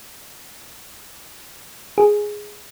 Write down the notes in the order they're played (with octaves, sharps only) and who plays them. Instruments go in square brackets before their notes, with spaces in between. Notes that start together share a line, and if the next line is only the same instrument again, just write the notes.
[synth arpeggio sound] G#4